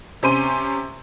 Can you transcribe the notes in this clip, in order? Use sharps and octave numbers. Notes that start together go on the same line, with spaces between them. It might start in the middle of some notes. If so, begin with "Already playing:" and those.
C3 C#4 C5 C6 D#7